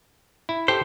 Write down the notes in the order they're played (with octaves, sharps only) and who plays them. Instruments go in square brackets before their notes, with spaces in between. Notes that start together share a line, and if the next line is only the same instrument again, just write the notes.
[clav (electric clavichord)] E4
[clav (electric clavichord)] G4 A4 [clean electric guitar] C5